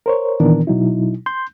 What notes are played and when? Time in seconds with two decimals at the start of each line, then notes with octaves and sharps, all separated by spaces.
0.06 A#4 C5 C#5
0.40 A#2 D#3 E3 B3 D4 A#4
0.67 B2 F#3 D#4 E4
1.26 C6 G6